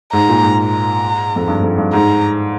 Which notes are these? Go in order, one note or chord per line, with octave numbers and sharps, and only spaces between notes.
G#2 A#5
A#2
G#2
A#5
F2
G2
F2
G2
G#2 A#5